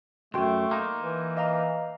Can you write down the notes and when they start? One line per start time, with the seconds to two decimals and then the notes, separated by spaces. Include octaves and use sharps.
0.34 C#2 F#2 A3 F#4 G5 C6
0.71 A#3 D#4 C6
1.02 E3
1.37 D#5 F5 A#5